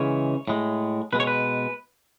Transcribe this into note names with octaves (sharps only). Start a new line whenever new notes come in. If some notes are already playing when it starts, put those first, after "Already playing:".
Already playing: C#3 E3 G#3 C#5
A2 G#3
B2 G#3 B4
C#5
B4